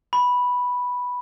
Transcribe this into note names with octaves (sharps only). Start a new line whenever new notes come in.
B5